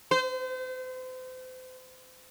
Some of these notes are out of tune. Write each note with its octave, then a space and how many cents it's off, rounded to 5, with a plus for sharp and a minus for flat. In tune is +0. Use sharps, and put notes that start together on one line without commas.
C5 -35